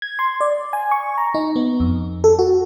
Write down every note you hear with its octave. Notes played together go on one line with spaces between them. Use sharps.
G#6
C6
D5
G#5
C#6
A#5
D#4
B3
F2
A4
F#4